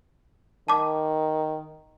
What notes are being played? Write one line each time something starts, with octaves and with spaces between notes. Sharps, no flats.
D#3 A5 D6